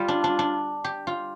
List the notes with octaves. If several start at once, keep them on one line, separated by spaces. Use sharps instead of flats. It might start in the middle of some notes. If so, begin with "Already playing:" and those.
Already playing: G3 F4
D4
D4
D4
G4
F4